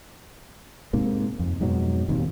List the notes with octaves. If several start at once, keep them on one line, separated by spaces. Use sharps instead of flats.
G#2 C3 A#3
F2
F2 G#2 B2 F#3
D#1 D#2 C3